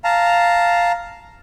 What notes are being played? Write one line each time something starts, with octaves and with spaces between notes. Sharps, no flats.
F5 A5 A#5